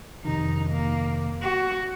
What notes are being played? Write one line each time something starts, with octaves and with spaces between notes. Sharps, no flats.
F2 C3 D#3 D#4
A#3
F#4